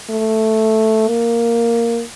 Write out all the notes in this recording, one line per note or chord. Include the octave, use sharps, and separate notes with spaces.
A3
A#3